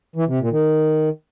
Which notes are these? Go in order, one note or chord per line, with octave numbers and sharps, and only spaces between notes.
E3
C3
A#2
D#3